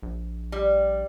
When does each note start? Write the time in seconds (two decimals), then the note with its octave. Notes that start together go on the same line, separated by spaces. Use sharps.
0.03 A#1
0.52 G3